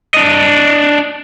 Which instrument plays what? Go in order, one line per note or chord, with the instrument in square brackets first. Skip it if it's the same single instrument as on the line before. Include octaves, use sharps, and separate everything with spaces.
[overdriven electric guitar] D4 D#5